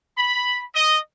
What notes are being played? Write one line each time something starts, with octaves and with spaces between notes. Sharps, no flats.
B5
D#5